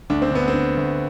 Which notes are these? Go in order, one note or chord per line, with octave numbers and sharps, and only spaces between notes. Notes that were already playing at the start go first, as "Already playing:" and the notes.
D2 D4
C4
D3 B3
C4
D3
D2